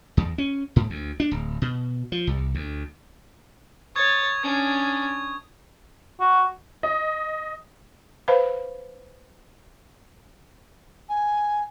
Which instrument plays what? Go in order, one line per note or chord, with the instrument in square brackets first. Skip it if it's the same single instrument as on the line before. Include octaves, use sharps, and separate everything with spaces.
[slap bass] E2
C#4
G#2
D2
D4
D1
B2
F3
C2
D2
[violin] C#5 A6 [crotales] C#6 D#6 G#6
[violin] C#4 D4 [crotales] G#6
[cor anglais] F#4
[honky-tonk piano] D#5
[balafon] B4 C5 F5 B5
[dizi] G#5